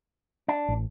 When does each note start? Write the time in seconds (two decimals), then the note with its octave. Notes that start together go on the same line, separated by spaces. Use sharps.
0.48 D4
0.68 A1